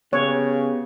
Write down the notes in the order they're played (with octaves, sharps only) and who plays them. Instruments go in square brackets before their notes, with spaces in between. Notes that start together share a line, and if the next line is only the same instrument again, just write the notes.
[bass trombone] C#3 [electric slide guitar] B3 G4 [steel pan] C#5